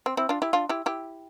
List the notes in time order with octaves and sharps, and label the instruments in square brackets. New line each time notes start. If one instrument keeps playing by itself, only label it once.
[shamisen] C4
C4 E4
D4 F4
E4 G4
D4 F4
E4 G4
E4 G4